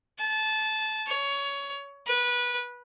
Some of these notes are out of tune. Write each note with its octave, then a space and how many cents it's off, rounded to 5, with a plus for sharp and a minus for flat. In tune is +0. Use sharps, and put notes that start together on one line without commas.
A5 -20
C#5 +20
B4 -20